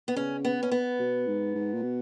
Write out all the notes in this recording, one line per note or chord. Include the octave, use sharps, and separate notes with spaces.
B3
C#3 C#4
B3
C#4
B3
B2
G#2
G#2
A#2
B2